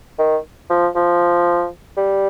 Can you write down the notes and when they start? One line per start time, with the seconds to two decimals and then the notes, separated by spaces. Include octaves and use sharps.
0.19 D#3
0.70 F3
0.96 F3
1.97 G3